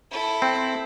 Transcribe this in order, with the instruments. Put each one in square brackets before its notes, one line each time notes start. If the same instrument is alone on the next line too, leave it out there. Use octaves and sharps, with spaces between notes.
[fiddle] E4 A4
[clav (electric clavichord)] C4